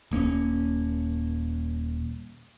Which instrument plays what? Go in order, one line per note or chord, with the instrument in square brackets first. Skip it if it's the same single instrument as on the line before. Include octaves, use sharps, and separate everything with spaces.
[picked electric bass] D#1 A#3 B3 C#4